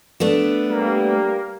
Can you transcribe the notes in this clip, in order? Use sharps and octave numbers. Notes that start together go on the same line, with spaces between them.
A3 B3 D4
G3 A#3